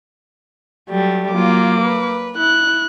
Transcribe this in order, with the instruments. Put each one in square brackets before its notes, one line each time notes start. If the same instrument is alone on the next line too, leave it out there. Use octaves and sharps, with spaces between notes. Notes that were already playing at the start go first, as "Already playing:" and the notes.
[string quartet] F#3 G3 A3
[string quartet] F#3 F4 [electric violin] A#3 D6
[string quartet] B4
[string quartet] E4 [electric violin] F#6